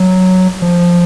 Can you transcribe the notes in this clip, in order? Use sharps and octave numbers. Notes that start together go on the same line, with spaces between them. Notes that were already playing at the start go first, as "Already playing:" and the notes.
Already playing: F#3
F3